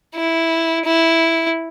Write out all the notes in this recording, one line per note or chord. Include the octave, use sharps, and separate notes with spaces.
E4
E4